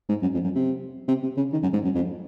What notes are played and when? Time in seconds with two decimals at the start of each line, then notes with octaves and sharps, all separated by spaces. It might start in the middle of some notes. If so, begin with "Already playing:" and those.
0.09 G#2
0.22 F#2
0.34 F2
0.44 F#2
0.55 C3
1.08 C3
1.23 C3
1.37 C#3
1.52 D#3
1.62 F#2
1.73 G#2
1.84 F#2
1.95 F2